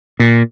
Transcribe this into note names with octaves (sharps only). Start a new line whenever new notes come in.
A#2